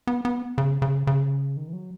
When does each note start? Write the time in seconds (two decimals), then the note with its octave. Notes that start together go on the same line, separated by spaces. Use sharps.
0.07 B3
0.25 B3
0.58 C#3
0.82 C#3
1.07 C#3
1.57 D#3
1.68 E3
1.73 F#3